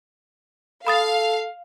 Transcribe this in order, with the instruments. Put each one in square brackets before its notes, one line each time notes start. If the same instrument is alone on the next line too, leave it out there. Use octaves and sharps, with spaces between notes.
[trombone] A4 [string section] F5 [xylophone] B5 D#6 A6